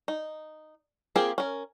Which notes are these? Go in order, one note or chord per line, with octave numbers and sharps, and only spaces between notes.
D#4
A#3 C4 F4 G4 G#4
C#4 A#4